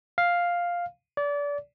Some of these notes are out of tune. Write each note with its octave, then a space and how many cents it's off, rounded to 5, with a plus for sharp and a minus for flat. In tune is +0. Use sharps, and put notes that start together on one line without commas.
F5 +5
D5 -30